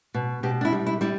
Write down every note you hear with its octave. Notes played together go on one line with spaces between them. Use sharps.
B2
B2 G4
D4
E4
G3
E4
G3 E4